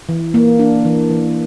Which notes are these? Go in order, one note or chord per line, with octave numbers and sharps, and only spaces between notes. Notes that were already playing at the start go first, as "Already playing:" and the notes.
E3
A#3
D4
E3
E3